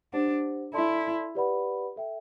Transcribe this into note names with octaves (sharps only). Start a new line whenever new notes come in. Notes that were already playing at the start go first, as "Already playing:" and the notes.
D4 G4 C5 F#5
E4 A4 D5 A5 C6
G4 B4 D5 F#5 B5
A4 E5 G5